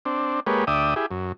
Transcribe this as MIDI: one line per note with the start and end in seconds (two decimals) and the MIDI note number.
0.05 0.40 60
0.05 0.40 62
0.47 0.65 56
0.47 0.65 58
0.47 0.65 67
0.47 0.65 71
0.47 0.65 73
0.67 0.94 38
0.67 0.94 74
0.67 0.94 76
0.67 0.94 79
0.67 0.94 87
0.96 1.06 64
0.96 1.06 67
0.96 1.06 68
1.11 1.32 42